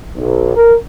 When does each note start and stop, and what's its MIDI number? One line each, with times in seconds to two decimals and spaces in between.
0.15 0.54 35
0.56 0.74 70